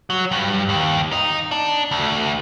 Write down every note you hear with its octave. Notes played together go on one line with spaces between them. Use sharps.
F#3
G2
D#2
D#4
D4
D2